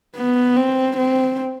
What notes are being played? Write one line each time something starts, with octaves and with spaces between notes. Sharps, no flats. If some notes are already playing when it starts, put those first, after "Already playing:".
B3
C4
C4